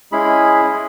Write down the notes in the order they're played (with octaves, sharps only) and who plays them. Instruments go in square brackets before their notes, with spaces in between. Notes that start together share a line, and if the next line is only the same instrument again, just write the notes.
[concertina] G#3 C#4 E4 G#4 B5
G#3 G#4